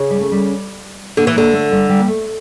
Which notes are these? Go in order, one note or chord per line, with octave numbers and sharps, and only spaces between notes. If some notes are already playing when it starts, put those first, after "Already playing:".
Already playing: C#3
G3
A3
G3
D3 A#3
E3
D3 A#3
A3
G3
G3
A#3
A3